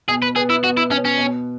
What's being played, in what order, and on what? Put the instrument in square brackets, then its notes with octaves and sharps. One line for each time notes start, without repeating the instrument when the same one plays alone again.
[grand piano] B2 [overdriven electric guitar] G#4
[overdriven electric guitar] B4
[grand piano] B3 [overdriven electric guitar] G#4
[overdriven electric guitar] E4
[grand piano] B2 [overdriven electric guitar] F#4
[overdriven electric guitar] E4
[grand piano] B2 [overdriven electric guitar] C#4
[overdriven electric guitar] C#4
[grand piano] B2